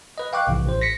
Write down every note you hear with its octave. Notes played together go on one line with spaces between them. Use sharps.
B4 D#5
F5 G5 C#6 D6 F#6
B1 G#2 C3 E3
A1 C5
A#6 B6 C#7